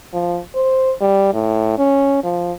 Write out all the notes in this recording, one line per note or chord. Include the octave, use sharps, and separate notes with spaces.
F3
C5
G3
A2
C#4
F3